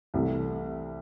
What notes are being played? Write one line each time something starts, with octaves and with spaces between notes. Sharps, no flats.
C2 C3 E3 A3